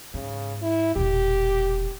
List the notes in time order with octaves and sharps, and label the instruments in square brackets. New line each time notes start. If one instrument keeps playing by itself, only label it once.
[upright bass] G#2 [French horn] C#3
[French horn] E4
[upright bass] E1 A#2 [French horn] G4